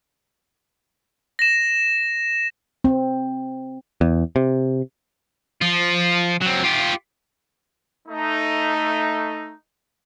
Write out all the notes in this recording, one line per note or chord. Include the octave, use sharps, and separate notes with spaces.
A#6 E7
C4
E2
C3
F3 F4
F#3 C4
F4 G4
A3 D#4